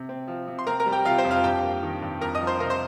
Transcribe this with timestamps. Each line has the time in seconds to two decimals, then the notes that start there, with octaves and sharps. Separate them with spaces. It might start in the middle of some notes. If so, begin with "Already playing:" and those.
Already playing: C3
0.09 C4
0.28 F3
0.48 C3
0.59 C6
0.67 C4 A#4 A#5
0.80 A#4 A#5
0.86 G3
0.92 G4 G5
1.05 C3 F4 F5
1.18 C5
1.24 F2
1.31 F4 F5
1.44 G2 G4 G5
1.63 A#3
1.83 D#3
2.02 G2
2.21 F2 A#4 A#5
2.35 D#5 D#6
2.41 F3
2.47 C5 C6
2.60 C3 A#4 A#5
2.70 C5 C6